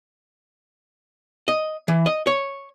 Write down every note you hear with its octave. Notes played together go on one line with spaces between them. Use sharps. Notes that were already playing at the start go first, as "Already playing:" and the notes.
D#5
E3
D#5
C#5